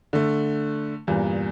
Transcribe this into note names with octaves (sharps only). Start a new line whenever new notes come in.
D3 A3
E2 G2 A#2